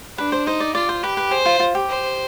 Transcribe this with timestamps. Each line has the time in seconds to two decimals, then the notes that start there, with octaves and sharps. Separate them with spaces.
0.18 D4 B4
0.32 C5
0.47 D#4 C5
0.60 D5
0.75 F4 D5
0.89 C5
1.03 G4 B4
1.17 B4
1.31 G#4 C5
1.46 F4
1.60 F4
1.75 G4
1.89 C5